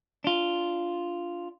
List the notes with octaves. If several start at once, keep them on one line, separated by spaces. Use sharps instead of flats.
D4 F4